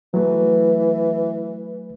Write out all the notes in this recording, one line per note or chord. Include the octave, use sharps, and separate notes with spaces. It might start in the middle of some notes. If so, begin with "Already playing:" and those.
E3 F#3 A3